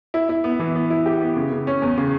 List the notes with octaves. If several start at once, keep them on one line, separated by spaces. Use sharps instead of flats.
E4
E4
B3
E3
B3
E4
G4
B3
C#3
C#3
C#4
E2
C#3